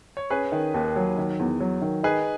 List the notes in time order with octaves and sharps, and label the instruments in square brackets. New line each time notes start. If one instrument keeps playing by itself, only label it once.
[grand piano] C#5
[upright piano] C#4 [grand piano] G#4 B4
[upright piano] D#3
D#2
F#3
D#3
E2
F#3
D#3
[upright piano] D#4 [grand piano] G#4 B4